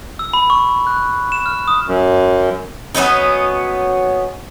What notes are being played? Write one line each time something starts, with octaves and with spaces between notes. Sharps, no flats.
E6
B5
C#6
F#6
E7
F6
D#6
F#2
F#3 B3 C#4 D#4